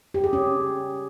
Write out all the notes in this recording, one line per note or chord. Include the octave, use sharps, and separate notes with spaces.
G4
G#4
C#4